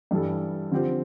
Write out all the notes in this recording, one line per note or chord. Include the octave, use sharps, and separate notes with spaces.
G2 E3 G3 D4 A4
D3 F3 C4 G4